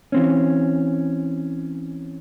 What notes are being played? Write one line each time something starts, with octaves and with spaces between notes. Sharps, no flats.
E3 C4 C#4